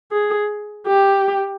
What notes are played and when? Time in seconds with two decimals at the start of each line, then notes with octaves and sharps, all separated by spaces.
0.12 G#4
0.87 G4